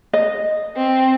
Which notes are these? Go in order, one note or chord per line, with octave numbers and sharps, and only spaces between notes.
D#5
C4